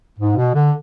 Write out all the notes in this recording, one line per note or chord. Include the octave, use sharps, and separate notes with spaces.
G#2
B2
D3